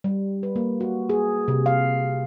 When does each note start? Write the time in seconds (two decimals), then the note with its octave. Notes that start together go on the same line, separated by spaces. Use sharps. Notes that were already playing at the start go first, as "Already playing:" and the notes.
0.04 G3
0.43 B4
0.56 A#3
0.80 F#4
1.09 G#4
1.48 C3
1.66 F5